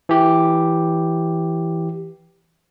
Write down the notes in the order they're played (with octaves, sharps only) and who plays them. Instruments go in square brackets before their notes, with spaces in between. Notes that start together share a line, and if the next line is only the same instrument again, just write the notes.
[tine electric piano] E3 G4